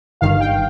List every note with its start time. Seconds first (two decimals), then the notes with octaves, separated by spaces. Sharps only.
0.21 G1 G2 D#3 F5
0.40 G5